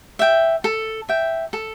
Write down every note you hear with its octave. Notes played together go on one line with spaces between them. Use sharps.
E5 G5
A4
E5 G5
A4